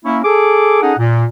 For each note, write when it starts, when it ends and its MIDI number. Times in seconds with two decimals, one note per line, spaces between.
0.05 0.19 58
0.05 0.19 61
0.05 0.19 64
0.24 0.78 68
0.24 0.78 69
0.24 0.78 86
0.83 0.93 61
0.83 0.93 63
0.83 0.93 68
0.83 0.93 69
0.83 0.93 78
0.98 1.25 46